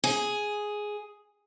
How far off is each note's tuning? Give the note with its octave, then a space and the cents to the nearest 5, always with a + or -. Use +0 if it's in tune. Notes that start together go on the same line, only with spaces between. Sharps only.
G#4 +5